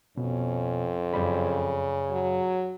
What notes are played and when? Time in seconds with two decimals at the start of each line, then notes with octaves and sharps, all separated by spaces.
0.17 F2 B2 C#4
1.13 F#2 C#3 D5 B5
2.11 F#3